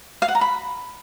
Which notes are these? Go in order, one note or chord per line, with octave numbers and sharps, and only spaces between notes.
F5
F#5
A#5
B5